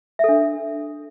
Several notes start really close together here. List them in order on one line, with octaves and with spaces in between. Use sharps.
E5 A4 D4